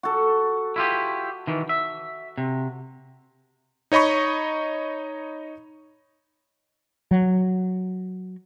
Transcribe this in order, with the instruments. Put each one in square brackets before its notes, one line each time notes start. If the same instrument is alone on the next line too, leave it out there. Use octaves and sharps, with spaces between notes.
[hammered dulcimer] F#4 A4
[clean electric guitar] E4 F4 G4
D#3 E3
E5
C3
[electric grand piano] D#4 C#5 D#5 B5 C#6
[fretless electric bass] F#3